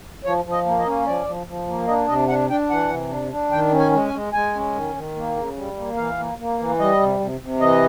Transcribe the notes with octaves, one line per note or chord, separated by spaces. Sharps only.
F3 C#5
F3
D#5
A#3
D#5
C#4
F3 D5
F3
F3
A#3
D4 D#5
C3 D#5
D4 F#5
D4 G5
E3 F#5
C3
D4
D4
D#3 G5
C#4
G#5
G#3
G#5
G#3
G#3 G#5
C#4
D#3
D#3
A#3
C#3
G3
A#3
E3 F5
A#3
A#3
E3
G3 D#5
C3
C3
C3
E3 D#5